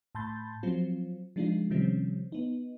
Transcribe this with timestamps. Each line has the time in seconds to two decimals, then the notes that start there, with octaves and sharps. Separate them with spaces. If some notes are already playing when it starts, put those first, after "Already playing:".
0.15 A2 A5 B5 C6 G6 A6
0.63 F3 F#3 C4 F4
1.36 F3 G#3 D4 D#4 F4
1.70 C3 D#3 F3 G3 C4 C#4
2.32 B3 D#4